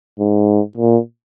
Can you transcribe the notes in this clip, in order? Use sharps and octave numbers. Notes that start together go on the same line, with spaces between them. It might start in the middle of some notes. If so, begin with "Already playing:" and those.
G#2
A#2